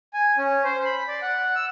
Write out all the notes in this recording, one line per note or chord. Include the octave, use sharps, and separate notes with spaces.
G#5
C#4
C5
B5
D5
F#5
E6